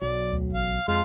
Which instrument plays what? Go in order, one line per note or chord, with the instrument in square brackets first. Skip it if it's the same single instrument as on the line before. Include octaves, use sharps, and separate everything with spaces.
[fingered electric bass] B1 F#3 [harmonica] D5
[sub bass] D2
[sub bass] A1 [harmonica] F5
[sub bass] F2 [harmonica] F3 F5 C6 [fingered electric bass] G#3